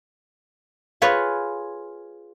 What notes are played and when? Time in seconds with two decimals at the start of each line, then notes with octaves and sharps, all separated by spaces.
1.02 F4 G#4 B4 C#5